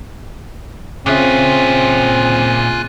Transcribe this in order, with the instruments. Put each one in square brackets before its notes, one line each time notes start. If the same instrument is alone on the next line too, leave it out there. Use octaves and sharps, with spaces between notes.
[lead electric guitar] A#2 E5 [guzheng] C#3 [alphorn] C4 [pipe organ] F4 G#5 F#6